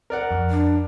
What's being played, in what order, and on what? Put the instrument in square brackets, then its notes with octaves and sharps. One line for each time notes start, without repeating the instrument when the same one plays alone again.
[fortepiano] A#4 D5 F#5
[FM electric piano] F2
[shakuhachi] D4